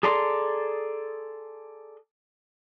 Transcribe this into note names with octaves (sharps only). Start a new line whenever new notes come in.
G#4 A4 D5 A#5 C6